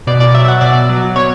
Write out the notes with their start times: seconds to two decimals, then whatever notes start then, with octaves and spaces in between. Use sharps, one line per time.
0.07 B2 D5
0.20 D5
0.34 F#3 E5
0.48 F#5
0.61 B2 D5
0.89 F#3
1.16 B2 C#5